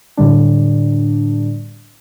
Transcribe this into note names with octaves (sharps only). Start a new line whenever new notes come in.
A2 D3 G3 D4